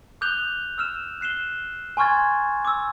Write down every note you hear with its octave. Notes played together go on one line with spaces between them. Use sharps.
D6 D#6 F#6 G6 F7 G7
E6 F6 E7
F#6 C7 E7 G7
G#5 C6 C#6 F6 G#6 A6
D6 E6